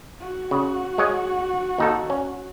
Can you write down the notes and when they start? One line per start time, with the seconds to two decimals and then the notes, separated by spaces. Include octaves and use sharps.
0.20 F#4
0.51 C#3
0.98 G#3 C#5 D#5
1.78 D#2 D#4 A4
2.10 C#4